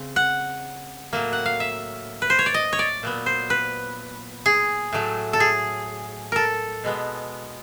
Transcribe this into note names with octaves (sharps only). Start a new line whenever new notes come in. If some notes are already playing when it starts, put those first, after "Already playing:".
Already playing: C#3 C4
F#5
A2 F#3 A#3
F#5
F5
E5
B4
C5
C#5
D5
D#5
C#5
D5
A#2 F#3 B3
C5
B4
G#4
A2 F#3 A3
A4
G#4
A4 A#4
B2 G#3 B3